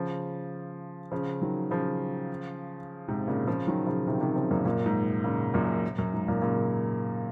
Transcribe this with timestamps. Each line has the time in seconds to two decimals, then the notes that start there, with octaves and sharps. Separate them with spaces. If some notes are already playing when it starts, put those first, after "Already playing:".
Already playing: C#3 F3
1.12 C#3 F3
1.42 D#3 F#3
1.71 C#3 F3
3.08 G#2 C3
3.28 A#2 C#3
3.47 C#3 F3
3.67 D#3 F#3
3.87 C#3 F3
4.07 C3 D#3
4.21 C3 D#3
4.36 C#3 F3
4.50 F#2 A#2
4.65 F#2 A#2
4.86 G#2
5.24 A#2 C#3
5.54 F#2 A#2
5.98 F#2
6.13 G#2
6.28 F#2 A#2
6.42 A#2 C#3